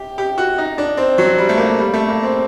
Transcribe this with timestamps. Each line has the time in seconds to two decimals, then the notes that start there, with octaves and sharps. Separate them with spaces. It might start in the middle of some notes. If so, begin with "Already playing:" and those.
Already playing: G4
0.18 G4
0.38 F#4
0.58 D#4
0.78 D4
0.97 C4
1.18 F#3
1.38 G3
1.49 A3
1.58 A#3
1.78 G3
1.94 A3
2.09 A#3
2.23 C4